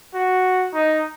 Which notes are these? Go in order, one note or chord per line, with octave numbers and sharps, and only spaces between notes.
F#4
D#4